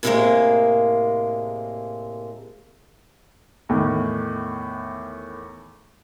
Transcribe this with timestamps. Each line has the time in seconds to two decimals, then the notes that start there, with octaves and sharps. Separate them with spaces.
0.03 A2 C3 E3 G3 G#3 A#3
3.69 E2 A2 D#3